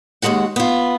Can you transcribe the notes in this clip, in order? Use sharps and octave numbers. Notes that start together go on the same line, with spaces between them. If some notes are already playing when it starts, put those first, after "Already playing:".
D#2 E3 G#3 F#4 F#5
B3 F4